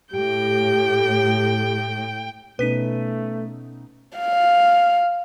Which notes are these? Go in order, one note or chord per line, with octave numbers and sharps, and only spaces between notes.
A2 G4 G5
B2 A3 B3 C#4 D#4 B4 B6 D#7
F5